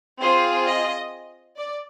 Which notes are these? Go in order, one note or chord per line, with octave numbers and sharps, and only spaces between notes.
C4 F4 G#4 C5
D#5
D5